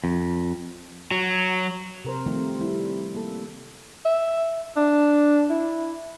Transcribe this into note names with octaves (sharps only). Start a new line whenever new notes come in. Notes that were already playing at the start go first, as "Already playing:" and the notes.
F2
F#3
C3 A#4 C5
D#3 F3 G3 A3 C4 F4
G3 E4
A#3 A4
E5
D4
E4